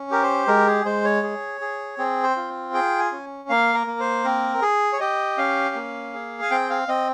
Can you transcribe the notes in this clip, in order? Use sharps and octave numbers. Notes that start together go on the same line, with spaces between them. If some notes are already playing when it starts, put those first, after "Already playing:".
Already playing: C#4
G4 A#4
C5
G#3 A#4
G#4
G#3 C5
C#5
G#4
G#4
C4 G#4
C5
F4
G#4 G5
G#5
C#4
A#3 F5
A#4
A#3
C5
C4 A#4
G#4
C#5
G4 D#5
C#4 F5
A#3
G#4
G#5
C4 G5
F5
C4 D#5